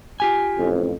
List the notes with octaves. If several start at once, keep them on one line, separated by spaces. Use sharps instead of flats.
F4 G4 G#5
A1 F2